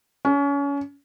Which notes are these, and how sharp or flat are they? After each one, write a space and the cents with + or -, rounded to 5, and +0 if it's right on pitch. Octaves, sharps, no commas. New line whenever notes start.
C#4 +30